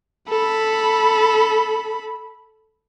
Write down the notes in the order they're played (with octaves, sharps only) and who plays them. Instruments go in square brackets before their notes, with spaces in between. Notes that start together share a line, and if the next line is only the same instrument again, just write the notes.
[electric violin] A4 B5